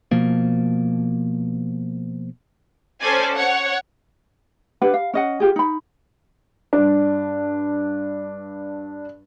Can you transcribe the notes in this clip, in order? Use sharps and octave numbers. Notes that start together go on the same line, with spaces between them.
B2 F3 A#3
C#4 A4 C5 D5 G#5
C#5 F#5
D4 G4 B4 F#5
F5
C#4 D#5 F#5
F4 G4 G#4
D#4 B5
G2 D4